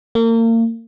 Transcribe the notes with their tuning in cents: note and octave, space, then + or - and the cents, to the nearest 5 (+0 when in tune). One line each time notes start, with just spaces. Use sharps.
A#3 -35